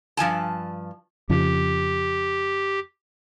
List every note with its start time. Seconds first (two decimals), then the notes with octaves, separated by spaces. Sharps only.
0.17 G2 F3 G#5 A5
1.29 F2 C#3 F3 G4